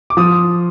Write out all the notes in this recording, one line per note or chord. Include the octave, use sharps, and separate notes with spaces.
D6
F3 D#6